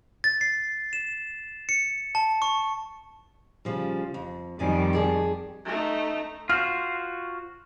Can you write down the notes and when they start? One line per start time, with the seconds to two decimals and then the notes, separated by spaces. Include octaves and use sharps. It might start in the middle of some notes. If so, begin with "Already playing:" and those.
0.24 A6
0.41 C7
0.93 E7
1.69 C#7
2.15 A5
2.42 C#6
3.65 C#3 F3 G3
4.14 F2
4.59 F2 D#3 G3 D5 G#5 A#5
4.93 G4 G#4 A5
5.65 A3 D#4
6.49 F4 F#4 C5 F6